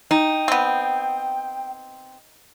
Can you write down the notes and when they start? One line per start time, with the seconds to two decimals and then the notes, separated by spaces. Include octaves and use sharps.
0.11 D#4 G5
0.48 B3 C4